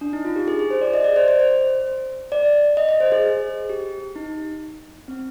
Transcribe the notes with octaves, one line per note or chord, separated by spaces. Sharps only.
D4
D#4
F4
G4
G#4
G#4
C5
D5
D#5
D5
C5
C5
C5
D5
D#5
D#5
C5
G#4
G4
D#4
C4